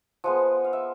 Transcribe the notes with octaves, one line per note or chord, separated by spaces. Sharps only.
F3 G#3 B3 F#5
F5
E5